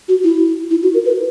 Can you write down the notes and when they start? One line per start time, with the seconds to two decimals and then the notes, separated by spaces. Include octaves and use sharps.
0.08 F#4
0.24 E4
0.71 E4
0.83 F#4
0.94 A#4
1.06 B4